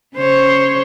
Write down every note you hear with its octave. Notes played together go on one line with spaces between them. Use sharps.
C#3 C5 C#5